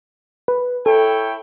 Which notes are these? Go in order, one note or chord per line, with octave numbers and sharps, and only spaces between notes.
B4
E4 A4 C#5 G5